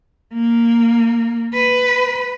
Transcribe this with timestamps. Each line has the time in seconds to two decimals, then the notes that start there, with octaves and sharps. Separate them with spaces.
0.34 A#3
1.54 B4